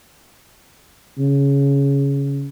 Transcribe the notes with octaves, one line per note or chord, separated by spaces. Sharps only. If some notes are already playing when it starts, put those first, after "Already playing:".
C#3